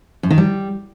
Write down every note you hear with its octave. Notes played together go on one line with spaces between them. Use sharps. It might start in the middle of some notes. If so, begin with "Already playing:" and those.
F#2
D#3
G3